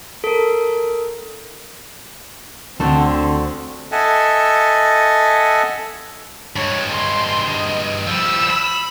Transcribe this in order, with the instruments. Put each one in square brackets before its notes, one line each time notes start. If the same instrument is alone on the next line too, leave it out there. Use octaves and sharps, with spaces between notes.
[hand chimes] A4 A#4
[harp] D2 A4 C5 [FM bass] D3 [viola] C4
[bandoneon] A4 D#5 E5 F#5 G#5 A5
[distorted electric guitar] G2 G#3 [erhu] C#5
[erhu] C6
D#5
[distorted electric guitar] F3 G3 [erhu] E6
[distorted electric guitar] B5